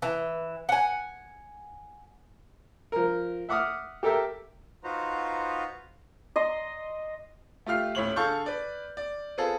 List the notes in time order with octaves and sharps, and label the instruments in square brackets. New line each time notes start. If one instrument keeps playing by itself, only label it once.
[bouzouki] E3
F#5 G#5
[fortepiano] F3 A#4
E5 F#5 D6 D#6 F6
G4 A4 A#4 E5 G5
[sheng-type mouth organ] D#4 F4 F#4 B4 C5 A#5
[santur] D#5 C6
[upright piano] A3 F4 G4 F6 C7
D#1 A2 C#5 F#7
D3 G#4 A4 F5 C#6 G6
B4 D5
D5
B3 C4 F4 G#4 A4